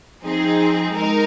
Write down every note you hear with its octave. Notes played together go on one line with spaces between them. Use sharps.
F3 C4 D#4 G#4
G#3 D#4 A#4